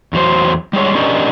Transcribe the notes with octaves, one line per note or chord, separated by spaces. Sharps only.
E2 F#3 C5
G3 G#3 C#5
C#4 D4 G4 A#4 D#5